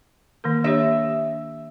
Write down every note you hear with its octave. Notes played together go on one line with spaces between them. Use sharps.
D#3 A#3 A#4
D4 G4 C#5 E5